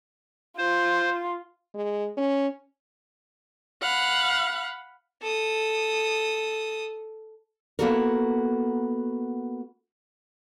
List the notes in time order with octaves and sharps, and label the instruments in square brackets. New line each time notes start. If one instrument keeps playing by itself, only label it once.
[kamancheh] F4 [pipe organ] C5
[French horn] G#3
C#4
[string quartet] F5 F#5 B5
[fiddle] A4 D#6
[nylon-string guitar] A#3 B3 E4 F#4 A4 A#4